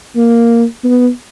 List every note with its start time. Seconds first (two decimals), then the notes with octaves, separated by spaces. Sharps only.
0.15 A#3
0.84 B3